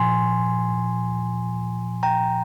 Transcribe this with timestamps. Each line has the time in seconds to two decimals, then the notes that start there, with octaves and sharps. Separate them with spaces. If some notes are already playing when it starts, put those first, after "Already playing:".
Already playing: A#2 F3 G#5 C6
2.03 G5 A#5